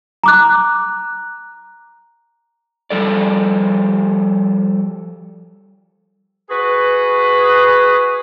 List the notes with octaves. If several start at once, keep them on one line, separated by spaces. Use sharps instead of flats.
A#5 D6 F#6
F3 G3 A4 D5
F#4 G#4 B4